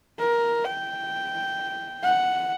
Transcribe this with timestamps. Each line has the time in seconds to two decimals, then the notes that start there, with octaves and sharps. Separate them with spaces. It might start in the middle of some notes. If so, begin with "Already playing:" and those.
0.19 A#4
0.64 G5
2.03 F#5